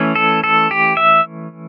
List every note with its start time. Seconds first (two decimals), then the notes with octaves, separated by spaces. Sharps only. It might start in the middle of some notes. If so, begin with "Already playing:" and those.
Already playing: E3 A3 C#4
0.16 A4
0.44 A4
0.71 G4
0.97 E5